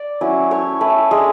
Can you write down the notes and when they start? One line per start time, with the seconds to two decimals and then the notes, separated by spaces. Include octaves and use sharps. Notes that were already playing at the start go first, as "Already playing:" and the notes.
Already playing: D5
0.21 F#3 C#4 E4
0.51 A3 E4 C#5
0.81 A3 E4 B4
1.11 G#3 D4 G#4